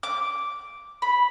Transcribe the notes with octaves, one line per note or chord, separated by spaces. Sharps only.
D6
B5